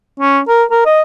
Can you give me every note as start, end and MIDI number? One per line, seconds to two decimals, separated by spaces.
0.20 0.40 61
0.48 0.64 70
0.71 0.83 70
0.86 1.02 75